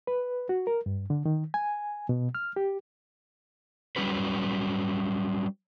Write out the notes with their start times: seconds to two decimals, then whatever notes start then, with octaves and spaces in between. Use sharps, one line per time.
0.07 B4
0.49 F#4
0.67 A#4
0.86 G2
1.10 D3
1.26 D#3
1.54 G#5
2.09 B2
2.35 F6
2.56 G4
3.96 F#3 G3 C#4 F#4 B4